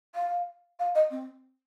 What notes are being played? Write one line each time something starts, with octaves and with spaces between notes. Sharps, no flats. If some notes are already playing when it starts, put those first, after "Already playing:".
F5
F5
D#5
C4